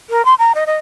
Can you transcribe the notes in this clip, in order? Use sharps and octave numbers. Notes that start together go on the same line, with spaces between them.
A#4
C6
A#5
D#5
D#5